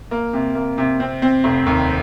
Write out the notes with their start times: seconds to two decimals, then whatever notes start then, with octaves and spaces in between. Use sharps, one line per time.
0.11 A#3
0.33 C3
0.55 A#3
0.78 C3
1.00 C4
1.22 C4
1.44 F1
1.66 D#2